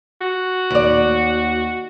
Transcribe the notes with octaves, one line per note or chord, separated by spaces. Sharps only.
F#4
D#2 D5